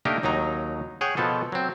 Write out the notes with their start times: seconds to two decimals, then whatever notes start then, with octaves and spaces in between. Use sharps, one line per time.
0.05 A3 A#3 D4 D#4 G4 A#4
0.23 D#2 F#3 D#4 A#5
1.01 G#4 C#5 F#5 G5
1.17 B2 F3 B3 A4
1.52 F#3 C4